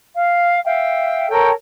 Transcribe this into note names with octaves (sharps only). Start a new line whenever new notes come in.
F5
E5 F5 G5
A4 A#4 C#5 G5